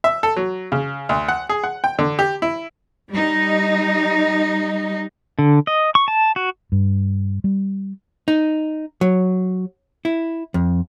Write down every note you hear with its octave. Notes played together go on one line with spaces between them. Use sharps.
E5
A4
F#3
C#3
D2
F#5
G#4
F#5
G5
D3
G4
E4
G3 D#4
D3
D#5
C#6
A5
F#4
G2
G3
D#4
F#3
E4
F2